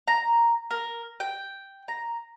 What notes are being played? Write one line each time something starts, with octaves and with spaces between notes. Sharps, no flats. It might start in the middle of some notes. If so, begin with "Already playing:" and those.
A#5
A#4
G5
A#5